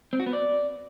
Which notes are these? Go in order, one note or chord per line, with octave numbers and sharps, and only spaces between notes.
C4
F#4
B3
D5